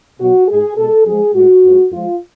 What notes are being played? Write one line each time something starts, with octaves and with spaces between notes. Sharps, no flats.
B2 F#3 F#4
G#2 G#3 G#4
B2 G#3 A4
F#2 F3 G#3 G#4
A2 G#3 F#4
F#2 F3 G#3
F2 F3 G#3 F4